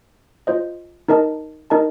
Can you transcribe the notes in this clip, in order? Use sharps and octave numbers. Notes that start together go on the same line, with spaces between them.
F4 C5 D#5
D#4 A#4 D#5 A5
D#4 A#4 D#5 A5